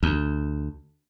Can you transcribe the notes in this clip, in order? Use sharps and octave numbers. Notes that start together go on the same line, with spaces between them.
D2